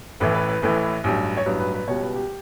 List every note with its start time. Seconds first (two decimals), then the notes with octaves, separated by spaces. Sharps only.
0.20 A1 A2 E3 B4
0.35 B4
0.49 B4
0.62 A1 A2 E3 B4
1.04 A1 G2 F#3
1.37 C#5
1.46 A1 G2 F#3 B4
1.59 B4
1.74 B4
1.88 C#2 B2 G3 C#5
2.02 B4
2.15 G4